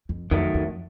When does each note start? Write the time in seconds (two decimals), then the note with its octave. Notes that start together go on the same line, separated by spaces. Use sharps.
0.09 F2
0.31 F2 D#3 F#3 A3
0.54 F2